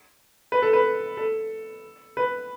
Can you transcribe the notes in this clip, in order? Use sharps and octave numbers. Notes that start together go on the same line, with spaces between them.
B4
A4
B4
A4
B4